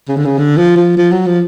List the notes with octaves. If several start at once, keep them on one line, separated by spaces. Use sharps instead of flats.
C#3
D3
C#3
D3
F3
F3
F3
F#3
F3